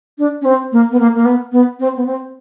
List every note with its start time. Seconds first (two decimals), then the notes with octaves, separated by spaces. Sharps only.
0.18 D4
0.42 C#4
0.45 C4
0.72 A#3
0.91 B3
0.99 A#3
1.15 A#3
1.25 B3
1.52 B3
1.80 C4
1.97 B3
2.06 C4